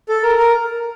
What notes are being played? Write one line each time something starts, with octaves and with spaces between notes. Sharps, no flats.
A4
A#4
A#4